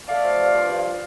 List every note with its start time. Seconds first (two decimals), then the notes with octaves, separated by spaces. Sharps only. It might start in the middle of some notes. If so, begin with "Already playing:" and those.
0.08 A3 D5 F5
0.24 F3
0.39 G2
0.54 F3
0.69 G2